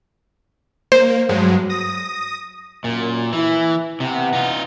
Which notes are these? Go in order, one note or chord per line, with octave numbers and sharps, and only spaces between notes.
A#3 C5
G2 F#3 G#3
D#6 A#6
F#2 A#2
E3 E4
C3 E3 B3
D#4 F4